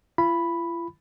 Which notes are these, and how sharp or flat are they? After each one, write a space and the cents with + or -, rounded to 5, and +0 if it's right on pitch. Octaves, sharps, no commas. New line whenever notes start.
F4 -45 B5 +0